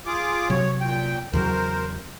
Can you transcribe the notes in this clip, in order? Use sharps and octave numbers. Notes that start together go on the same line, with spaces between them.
F4 G#4 D6
C3 F#3 C#5
A#2 G5
E2 C#3 F#3 A#4 C5